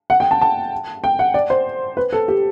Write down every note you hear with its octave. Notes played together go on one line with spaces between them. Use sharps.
F#5
G5
A5
A5
G5
F#5
D5
C5
B4
A4
G4